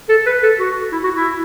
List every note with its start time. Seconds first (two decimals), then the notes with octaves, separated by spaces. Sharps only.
0.09 A4
0.26 B4
0.43 A4
0.59 F#4
0.92 E4
1.04 F#4
1.15 E4